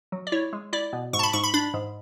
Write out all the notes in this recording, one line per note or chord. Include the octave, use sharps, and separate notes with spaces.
F#3
D5
E4 C#5
G#3
E4 D5
B2
G#2 C#6
A5
B5
G#2 C#6
B5
D4 B5
G#2